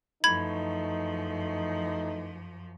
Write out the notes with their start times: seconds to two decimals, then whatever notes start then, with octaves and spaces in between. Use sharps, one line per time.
0.24 F#2 E3 F3 A3 D#4 B5 G#6